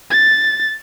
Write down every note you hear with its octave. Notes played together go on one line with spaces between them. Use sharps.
A6